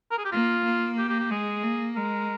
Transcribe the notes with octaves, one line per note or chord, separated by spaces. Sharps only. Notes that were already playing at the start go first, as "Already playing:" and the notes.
A#4
G#4
G4
A#3 F4
A#3
G4
G4
G4
G#3 G#4
A#3
G#3 A#4